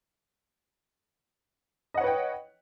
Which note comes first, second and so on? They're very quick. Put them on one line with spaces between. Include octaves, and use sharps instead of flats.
D#5 F#5 C#5 B4 G5